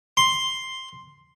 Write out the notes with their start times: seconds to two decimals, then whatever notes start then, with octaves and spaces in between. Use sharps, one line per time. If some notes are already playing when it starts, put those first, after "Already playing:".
0.17 C6